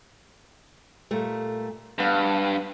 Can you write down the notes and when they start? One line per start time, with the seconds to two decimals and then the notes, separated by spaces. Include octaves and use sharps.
1.11 A#2 G3 A3
1.99 G2 B3 F5